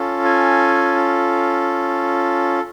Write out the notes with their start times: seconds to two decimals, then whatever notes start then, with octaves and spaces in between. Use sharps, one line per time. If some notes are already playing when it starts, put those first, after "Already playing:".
Already playing: C#4 F4 A4
0.25 G#5